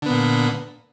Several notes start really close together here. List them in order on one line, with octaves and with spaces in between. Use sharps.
D3 B3 A#2